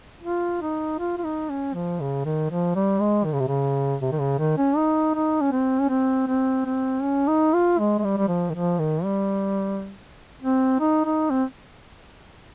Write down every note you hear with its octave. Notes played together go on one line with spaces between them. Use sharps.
F4
D#4
F4
F4
D#4
C#4
F3
C#3
D#3
F3
G3
G#3
D#3
C#3
C3
C#3
C3
D#3
C#3
D#3
C#4
D#4
D#4
C#4
C4
C#4
C4
C4
C4
C#4
D#4
F4
G#3
G#3
G3
G3
F3
D#3
F3
D#3
G3
C4
D#4
D#4
C4